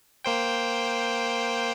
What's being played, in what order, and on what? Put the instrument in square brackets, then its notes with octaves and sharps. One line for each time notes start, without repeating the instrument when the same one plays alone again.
[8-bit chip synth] A#3 C5 G5